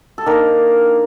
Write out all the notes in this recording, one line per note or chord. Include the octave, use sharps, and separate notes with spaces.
A4
D#3 A#3 D4 A#4